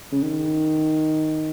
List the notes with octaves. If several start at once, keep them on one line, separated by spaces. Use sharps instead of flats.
C#3
D#3